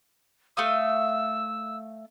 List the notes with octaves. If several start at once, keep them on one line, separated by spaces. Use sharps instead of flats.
A3 F5 D#6 E6